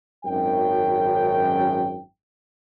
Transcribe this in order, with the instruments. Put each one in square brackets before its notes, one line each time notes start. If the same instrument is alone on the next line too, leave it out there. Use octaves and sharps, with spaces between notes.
[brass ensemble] G#1 F#2 G5